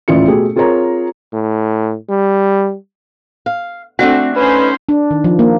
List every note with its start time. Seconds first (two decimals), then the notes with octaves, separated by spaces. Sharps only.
0.08 D#1 A1 E4 F4 D5 C#7
0.28 B2 A3 G4 G#4
0.56 C4 F4 G#4 A#4 C#5 A#5
1.34 A2
2.10 G3
3.46 F5
3.99 A3 C4 D4 F#4 F#5
4.36 C#4 D#4 B4 C5
4.89 D4
5.11 D#3
5.24 F3
5.39 A#3